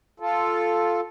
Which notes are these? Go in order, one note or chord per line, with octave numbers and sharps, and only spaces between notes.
F4 A4